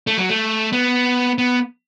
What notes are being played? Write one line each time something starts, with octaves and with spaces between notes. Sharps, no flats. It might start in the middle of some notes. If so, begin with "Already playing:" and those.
A3
F#3
A3
B3
B3